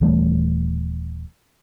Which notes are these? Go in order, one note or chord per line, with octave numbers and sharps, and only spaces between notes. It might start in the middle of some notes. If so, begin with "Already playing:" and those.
D#1 E3 G3 A3